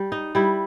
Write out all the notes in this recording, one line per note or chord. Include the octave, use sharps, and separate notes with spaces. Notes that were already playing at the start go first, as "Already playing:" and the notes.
Already playing: G3
D#4
G3 E4